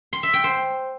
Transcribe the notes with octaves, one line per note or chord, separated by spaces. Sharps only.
C6
E5
G5
C5